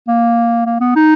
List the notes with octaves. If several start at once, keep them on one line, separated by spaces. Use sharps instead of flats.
A#3
A#3
B3
D#4